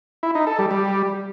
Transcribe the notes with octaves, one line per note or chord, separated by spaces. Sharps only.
E4
D#4
A4
G3
G3